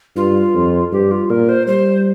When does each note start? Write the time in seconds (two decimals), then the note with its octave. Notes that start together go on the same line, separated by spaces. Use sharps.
0.16 G2 F4
0.54 F2
0.92 G2 G4
1.11 F4
1.30 A#2 A#4
1.49 C5
1.67 G3 C5